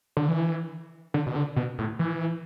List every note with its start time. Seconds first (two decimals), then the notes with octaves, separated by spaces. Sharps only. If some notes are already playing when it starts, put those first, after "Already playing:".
0.17 D3
0.28 E3
1.14 D3
1.26 B2
1.36 D3
1.56 B2
1.78 A2
1.99 E3